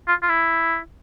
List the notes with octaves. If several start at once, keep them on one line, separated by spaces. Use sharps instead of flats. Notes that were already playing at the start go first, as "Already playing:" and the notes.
F4
F4
E4